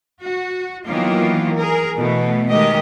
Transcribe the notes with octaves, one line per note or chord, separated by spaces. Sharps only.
F#4
D#3 E3 F#3 A#3 B3 F4
G#4 A#4
B2 E3 A3 B3
D#3 G#3 A3 G4 D#5